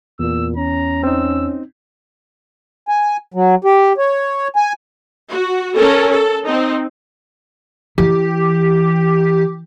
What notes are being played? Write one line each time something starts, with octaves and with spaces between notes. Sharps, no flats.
E2 A#2 E6
C#4 A#5
C4 D#4 E6
G#5
F#3
G4
C#5
G#5
F#4
C#4 A4 A#4
A4
C4 D#4
E3 G4